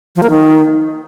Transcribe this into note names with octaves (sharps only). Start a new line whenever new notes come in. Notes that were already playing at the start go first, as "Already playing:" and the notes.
F3
A#3
D#3